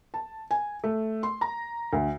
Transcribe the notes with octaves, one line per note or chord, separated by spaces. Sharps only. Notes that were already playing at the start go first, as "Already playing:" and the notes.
A5
G#5
A3
C6
A#5
D2